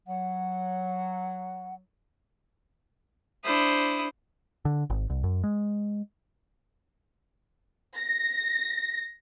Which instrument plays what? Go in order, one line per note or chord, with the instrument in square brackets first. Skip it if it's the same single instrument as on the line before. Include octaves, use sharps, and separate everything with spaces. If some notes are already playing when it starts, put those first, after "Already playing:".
[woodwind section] F#3 [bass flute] F#5
[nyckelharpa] D4 C5 [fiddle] E4 D#6
[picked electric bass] D3
G#1
C2
F#2
G#3
[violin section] A#6